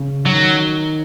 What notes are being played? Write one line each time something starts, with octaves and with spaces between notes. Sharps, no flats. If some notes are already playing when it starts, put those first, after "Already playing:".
Already playing: C#3
D#3 F#3